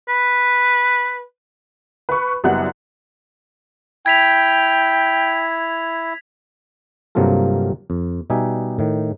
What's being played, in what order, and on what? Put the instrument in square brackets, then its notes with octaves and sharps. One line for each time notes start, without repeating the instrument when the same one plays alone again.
[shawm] B4
[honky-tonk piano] B4 B5 C#6
F#1 F#2 G3 B3 F#5 F#6
[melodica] E4 [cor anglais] G5 [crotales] G#6 B6 F7
[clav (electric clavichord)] G2 C3 F#3 A#3 F4 A4
F2
B2 G3 D#4 G4 E5 G#5
A2 D#3